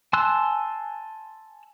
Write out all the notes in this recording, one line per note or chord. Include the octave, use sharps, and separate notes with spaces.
G#5 A5 C6 E6 F#6